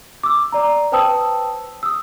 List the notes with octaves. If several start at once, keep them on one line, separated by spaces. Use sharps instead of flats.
D6 E6
D5 A#5
B4 C5 G5 A5 D#6 E6
D#6 E6